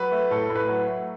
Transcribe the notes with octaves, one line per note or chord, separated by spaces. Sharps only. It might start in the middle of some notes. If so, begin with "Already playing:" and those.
Already playing: F#3 B4
A3
A2 A4
A2
B4
F#3
A3